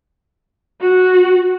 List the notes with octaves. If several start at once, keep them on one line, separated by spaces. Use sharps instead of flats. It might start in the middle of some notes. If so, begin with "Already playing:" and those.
F#4